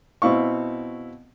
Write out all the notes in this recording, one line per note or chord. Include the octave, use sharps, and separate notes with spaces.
B2 C4 E4 F5 C#6